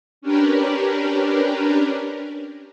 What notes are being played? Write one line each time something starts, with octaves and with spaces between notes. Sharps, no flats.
C#4 D4 G4 A#4 B4